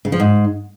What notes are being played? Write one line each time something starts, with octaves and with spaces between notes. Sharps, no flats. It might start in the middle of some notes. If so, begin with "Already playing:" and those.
C#3
F3
G#2